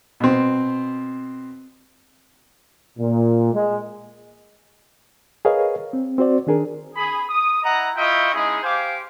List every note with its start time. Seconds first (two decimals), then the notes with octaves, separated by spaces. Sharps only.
0.20 B2 C4
2.99 A#2
3.54 G#3
5.45 G#4 A#4 B4 C#5 D#5 F5
5.93 C4
6.18 C4 F#4 C5 D5
6.47 D#3 D4 G#4 A#4
6.95 G#4 B5
7.29 D#6
7.63 E4 D#5 F#5 A#5
7.96 E4 F4 D#5 E5 G5 C#6
8.34 G#3 C#4 D#4 E4 G#4
8.63 G4 C5 F5 G#5 D6